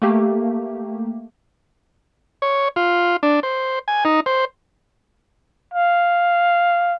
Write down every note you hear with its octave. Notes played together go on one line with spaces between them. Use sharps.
A3 A#3 G4
C#5
F4
D4
C5
G#5
D#4
C5
F5